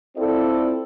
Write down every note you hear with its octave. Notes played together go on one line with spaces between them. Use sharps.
C4 E4 F4 A4 D5